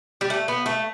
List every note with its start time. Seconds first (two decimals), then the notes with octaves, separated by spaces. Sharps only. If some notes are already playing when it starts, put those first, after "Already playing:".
0.21 G3
0.30 A3
0.48 B3
0.66 A3